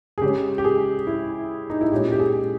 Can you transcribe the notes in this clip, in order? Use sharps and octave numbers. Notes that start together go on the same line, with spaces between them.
G#4
C#3 G#3 C#4 G4
G4
G#4
E4
D#4
E4
A#2 G#3 C#4 G4
G4
G#4